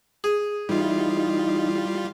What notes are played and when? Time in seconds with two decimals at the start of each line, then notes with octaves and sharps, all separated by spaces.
0.24 G#4
0.69 E3 G3 D#4 F4